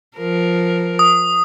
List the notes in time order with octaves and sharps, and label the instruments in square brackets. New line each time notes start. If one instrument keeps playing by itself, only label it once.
[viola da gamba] F3 A#4
[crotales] D#6